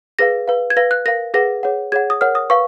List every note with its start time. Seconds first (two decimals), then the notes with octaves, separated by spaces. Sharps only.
0.19 G#4 B4 F5 A#6
0.48 B4 F5
0.70 G#6
0.77 B4 F5 A#6
0.91 F#6
1.06 A#4 F5 A#6
1.34 G#4 B4 F#5 A#6
1.63 G#4 C#5 F#5
1.92 G#4 C#5 F#5 G#6
2.10 D#6
2.21 A#4 C#5 F#5 F6
2.35 D#6
2.50 B4 F5 C#6